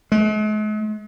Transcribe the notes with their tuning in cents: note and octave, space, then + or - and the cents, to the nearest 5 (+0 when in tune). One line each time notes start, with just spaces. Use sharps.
G#3 +45